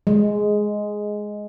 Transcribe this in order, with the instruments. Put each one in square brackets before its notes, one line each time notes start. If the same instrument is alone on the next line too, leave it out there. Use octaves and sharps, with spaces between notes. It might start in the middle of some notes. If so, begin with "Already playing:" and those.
[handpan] G#3